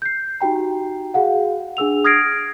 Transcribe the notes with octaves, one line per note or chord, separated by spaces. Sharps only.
G6 C7
D#4 F#4 G4 G5 A#5
F#4 G#4 F5 F#5
D4 G#4 E6 F7
D#6 F6 G#6 A#6 C7 D7